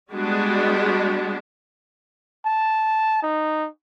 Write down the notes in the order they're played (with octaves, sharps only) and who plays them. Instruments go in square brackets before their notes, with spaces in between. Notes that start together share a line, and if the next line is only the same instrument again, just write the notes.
[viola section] G3 G#3 B3 D4 F#4
[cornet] A5
D#4